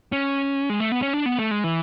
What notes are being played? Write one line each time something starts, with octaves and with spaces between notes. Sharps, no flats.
C#4
G#3
A3
B3
C#4
D4
B3
A3
G#3
E3